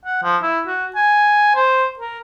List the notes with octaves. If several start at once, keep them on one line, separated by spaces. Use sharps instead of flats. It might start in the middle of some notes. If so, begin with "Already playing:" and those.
F#5
F3
E4
F#4
G#5
C5
A#4